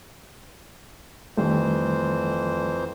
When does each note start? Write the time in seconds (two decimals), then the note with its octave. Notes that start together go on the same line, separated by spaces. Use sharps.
1.37 F2 D#3 E3 G3 A3 C5